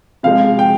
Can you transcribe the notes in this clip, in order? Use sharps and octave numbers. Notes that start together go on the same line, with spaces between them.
C3 F3 G#3 F5
G5